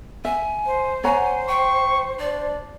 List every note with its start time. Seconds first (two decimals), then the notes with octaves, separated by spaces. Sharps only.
0.25 E5 G#5
0.66 C5
1.04 C#5 F#5 G#5 A#5
1.48 G5 C#6
2.19 D4 D5